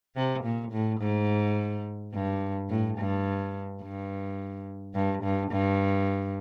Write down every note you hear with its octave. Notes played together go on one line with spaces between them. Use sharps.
C3
A#2
A2
G#2
G2
A2
G2
G2
G2
G2
G2